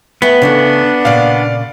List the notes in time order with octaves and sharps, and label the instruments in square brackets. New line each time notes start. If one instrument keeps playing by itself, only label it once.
[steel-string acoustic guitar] A3 B4 G5 [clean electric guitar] B3
[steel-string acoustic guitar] C#3 E3 A3 [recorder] D4
[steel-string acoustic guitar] A#2 C#3 [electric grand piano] D5 F5